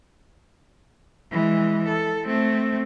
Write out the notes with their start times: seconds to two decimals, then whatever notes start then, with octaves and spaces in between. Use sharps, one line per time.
1.31 E3 G#3
1.88 A4
2.27 A3 C4